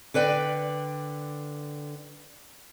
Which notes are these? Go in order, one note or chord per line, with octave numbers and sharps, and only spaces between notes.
D3 B4 D5 G5